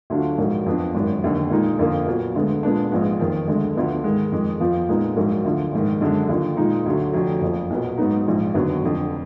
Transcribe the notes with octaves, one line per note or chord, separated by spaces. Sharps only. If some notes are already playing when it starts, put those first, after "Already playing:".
D2 D3 F#3 D4 F4
A#1 G#2 F#3 A#3
F2 F3 B3 D4
G#1 F#2 D#3
F1 D#2 D3
A#2 G#3 D#4
F2 D3 F3 A#3 F4
A#2 F#3 B3
D2 D3 G#3 B3
A#2 G#3 B3 D4
A#1 G#2 F3 G#3 B3
F#1 F2 D#3
D2 D3 G#3
D2 D3 F3 B3
G#2 D#3 G#3
F2 D#3 G#3
F2 F3 B3 F4
A#2 G#3 B3 D#4
A#1 G#2 F#3 A#3
D2 D3 F3
A#1 G#2 D#3
F#2 D3 G#3 D4
D#2 D3 F3
A#2 F3 G#3 D#4
D2 D3 F#3
F1 F2 D3 F#3
F#1 F2 F3
B1 A#2 F#3 B3
G#2 F#3 B3 D#4
A#1 G#2 F3
F1 D#2 D3 F#3 B3
F1 F2 D3